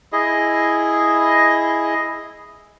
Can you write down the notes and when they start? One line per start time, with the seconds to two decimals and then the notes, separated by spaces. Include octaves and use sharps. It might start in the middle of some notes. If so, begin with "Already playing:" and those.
0.12 E4 G#4 D#5